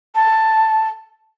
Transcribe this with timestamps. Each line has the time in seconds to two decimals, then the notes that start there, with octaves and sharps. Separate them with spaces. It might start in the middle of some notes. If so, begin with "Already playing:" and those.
0.15 A5